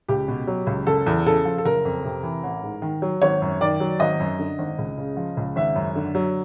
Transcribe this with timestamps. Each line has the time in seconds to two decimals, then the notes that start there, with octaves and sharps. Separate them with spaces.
0.08 C#2 G4
0.28 B2
0.47 F#3
0.67 C#2
0.87 F#1 A4
1.06 E2
1.26 C#3 A4
1.45 F3
1.58 A4
1.65 F#1 A#4
1.85 F2
2.05 C3
2.23 E3
2.43 A1
2.63 G#2
2.82 D#3
3.02 F#3
3.22 G#1 C#5
3.42 F#2
3.61 D#3 D5
3.80 F#3
4.00 G#1 D#5
4.20 F#2
4.39 D3
4.59 G#1
4.78 C#2
4.98 C#3
5.17 F3
5.37 C#2
5.56 G#1 E5
5.75 F#2
5.96 D3
6.15 F#3